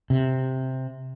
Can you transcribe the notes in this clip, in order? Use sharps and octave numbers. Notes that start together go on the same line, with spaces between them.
C3